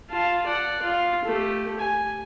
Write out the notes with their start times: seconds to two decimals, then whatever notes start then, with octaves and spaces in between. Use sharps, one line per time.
0.11 F4 A5
0.47 D5 F#5
0.83 F4
1.25 A3 G4
1.79 G#5